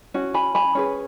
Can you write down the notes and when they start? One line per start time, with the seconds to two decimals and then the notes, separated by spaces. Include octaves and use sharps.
0.14 C#4 F#4
0.34 G#5 B5
0.55 G#5 B5
0.75 C#4 G#4 B4